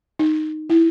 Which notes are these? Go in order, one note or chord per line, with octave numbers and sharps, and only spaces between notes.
D#4
E4